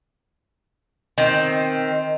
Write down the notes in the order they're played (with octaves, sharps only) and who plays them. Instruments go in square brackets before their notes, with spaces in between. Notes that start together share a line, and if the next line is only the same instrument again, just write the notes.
[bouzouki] D#3 C4